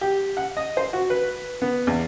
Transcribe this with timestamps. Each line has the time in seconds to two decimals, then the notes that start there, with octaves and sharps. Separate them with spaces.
0.01 G4
0.37 F#5
0.57 D#5
0.77 C5
0.93 F#4
1.10 B4
1.62 B3
1.87 E2